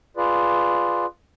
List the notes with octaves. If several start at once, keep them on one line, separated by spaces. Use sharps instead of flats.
F4 G#4 B4 D5